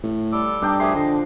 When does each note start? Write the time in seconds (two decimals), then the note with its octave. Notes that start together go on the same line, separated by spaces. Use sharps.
0.04 A2
0.32 G3 A4 D6
0.62 G2 D4 D#4 G5
0.80 F3 A3 G4 G#4 C6
0.95 D3 D#5